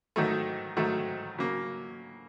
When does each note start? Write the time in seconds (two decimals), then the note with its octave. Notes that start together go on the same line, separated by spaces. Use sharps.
0.16 G#2 D#3 F#3 A3
0.77 G#2 D#3 F#3 A3
1.38 C#3 F#3 A#3